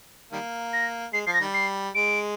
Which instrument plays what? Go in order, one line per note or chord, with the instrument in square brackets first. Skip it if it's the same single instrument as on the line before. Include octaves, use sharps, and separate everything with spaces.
[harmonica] D#3 G3 A#3
[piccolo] A#6
[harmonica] G#3 [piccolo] C7
[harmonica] F3 [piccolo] C7
[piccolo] A#6
[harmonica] D#3 G3
[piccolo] C7
[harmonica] G#3 [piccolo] D7